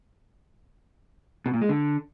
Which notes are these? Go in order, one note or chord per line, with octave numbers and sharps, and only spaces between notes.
B2
A#2
G#3
D3